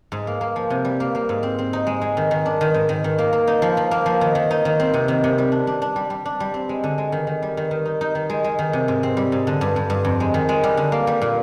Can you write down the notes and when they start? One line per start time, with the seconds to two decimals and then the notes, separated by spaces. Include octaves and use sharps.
0.12 G#2
0.27 A#3
0.41 A#3
0.56 F3
0.70 C3
0.85 G3
1.00 A#3
1.15 A#3
1.29 G#2
1.43 C4
1.59 C4
1.73 D#4
1.87 G#3
2.02 G#3
2.17 D#3
2.31 D#3
2.46 D4
2.61 D#3
2.74 G#2
2.89 D#3
3.04 D#3
3.18 A#3
3.33 A#3
3.47 D#4
3.62 F3
3.77 F3
3.91 A#3
4.06 F3
4.21 D#3
4.35 D#3
4.51 D#4
4.65 D#3
4.80 C4
4.94 C3
5.08 D#3
5.24 C3
5.38 G3
5.52 D4
5.67 D4
5.82 D4
5.96 G3
6.10 G3
6.25 D4
6.40 G3
6.54 C4
6.69 G#3
6.84 D3
6.98 G#3
7.12 D#3
7.27 D#3
7.42 G3
7.57 D#3
7.71 D#3
7.85 D#4
8.01 D#4
8.15 D#3
8.30 G#3
8.44 G#3
8.59 D#3
8.73 C3
8.88 G#2
9.03 C4
9.17 G3
9.32 G#2
9.47 D3
9.61 G2
9.76 G2
9.90 G2
10.05 F2
10.20 G#3
10.34 D#3
10.49 G#3
10.63 G3
10.77 D3
10.92 A#3
11.07 G3
11.21 A#2